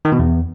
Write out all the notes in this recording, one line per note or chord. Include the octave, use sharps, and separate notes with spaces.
D#3
B2
E2